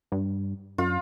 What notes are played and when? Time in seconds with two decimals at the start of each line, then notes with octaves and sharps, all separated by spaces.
0.12 G2
0.78 F#2 F4